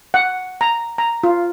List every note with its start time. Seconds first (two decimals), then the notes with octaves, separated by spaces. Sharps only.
0.14 F#5
0.61 A#5
0.98 A#5
1.24 F4